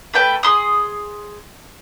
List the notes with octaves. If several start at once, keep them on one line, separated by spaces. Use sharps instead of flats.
A3 B4 G5 A5
G#4 C6 D#6